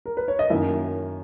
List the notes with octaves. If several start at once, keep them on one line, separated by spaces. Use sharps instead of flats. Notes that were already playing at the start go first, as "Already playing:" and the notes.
A#4
B4
C#5
D#5
F#2 D#3 A#3 E4 E5